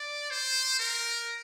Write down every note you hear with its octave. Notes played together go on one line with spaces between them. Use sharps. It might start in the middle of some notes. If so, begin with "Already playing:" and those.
Already playing: D5
C5
A#4